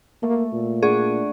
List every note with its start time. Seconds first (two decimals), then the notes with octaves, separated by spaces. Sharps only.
0.23 A3 A#3
0.53 A#2
0.83 D4 G#4 F#5 C#6